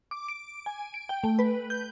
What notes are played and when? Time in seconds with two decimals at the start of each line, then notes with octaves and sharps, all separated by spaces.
0.11 D6
0.28 D7
0.66 G#5
0.94 D7
1.09 G5
1.24 A3
1.39 B4
1.70 G6